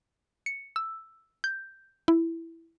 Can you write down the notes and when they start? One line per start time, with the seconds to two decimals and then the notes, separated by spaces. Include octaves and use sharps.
0.46 C#7
0.76 E6
1.44 G6
2.08 E4